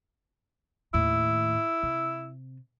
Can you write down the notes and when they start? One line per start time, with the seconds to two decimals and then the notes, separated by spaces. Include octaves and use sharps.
0.94 D#2 A2 E4
1.83 C3